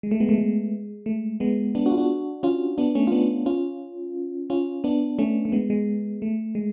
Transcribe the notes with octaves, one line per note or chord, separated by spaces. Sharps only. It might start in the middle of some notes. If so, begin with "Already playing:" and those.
G#3
A3
G#3 B3
A3
G#3
A3
G#3 B3
B3 D4
D4 F#4
F4
D4 F#4
C#4 F4
B3 D4
A3 C#4
F4
B3 D4
C#4 F4
C#4 F4
B3 D4
A3 C#4
A3
G#3 B3
G#3
A3
G#3